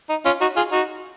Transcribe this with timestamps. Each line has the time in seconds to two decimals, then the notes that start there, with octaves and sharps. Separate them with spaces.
0.09 D#4
0.25 C#4 F4
0.41 D#4 F#4
0.56 F4 G#4
0.72 D#4 F#4